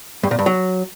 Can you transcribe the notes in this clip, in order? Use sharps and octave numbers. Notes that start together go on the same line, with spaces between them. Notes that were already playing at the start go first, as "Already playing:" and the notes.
G2
A#2
G2
F#3